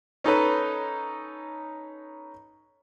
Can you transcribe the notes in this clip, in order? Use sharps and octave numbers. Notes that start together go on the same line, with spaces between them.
C#4 D#4 A4 B4